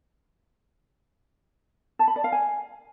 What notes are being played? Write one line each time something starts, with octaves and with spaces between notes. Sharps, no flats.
A5
B5
D5
F5
G#5